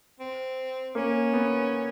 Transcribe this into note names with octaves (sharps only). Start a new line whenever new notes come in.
C4
A#3 C#4
B3